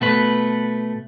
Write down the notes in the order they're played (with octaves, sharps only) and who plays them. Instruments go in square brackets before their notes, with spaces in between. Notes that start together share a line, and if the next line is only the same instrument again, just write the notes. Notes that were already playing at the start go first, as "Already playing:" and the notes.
[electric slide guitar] B2 A3 B4